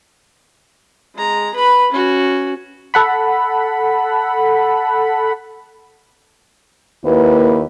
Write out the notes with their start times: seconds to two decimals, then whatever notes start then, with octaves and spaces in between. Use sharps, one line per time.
1.15 G#3 A#5
1.54 B4 B5
1.92 C#4 F#4
2.94 A4 F#5 B5
7.05 D#2 A#3 E4 B4